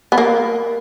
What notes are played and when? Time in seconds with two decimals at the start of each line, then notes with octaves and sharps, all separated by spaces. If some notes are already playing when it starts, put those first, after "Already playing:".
0.12 B3
0.18 A#3